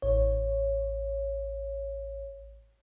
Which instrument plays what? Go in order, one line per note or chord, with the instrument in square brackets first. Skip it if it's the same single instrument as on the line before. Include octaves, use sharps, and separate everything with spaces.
[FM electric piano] A1 C#5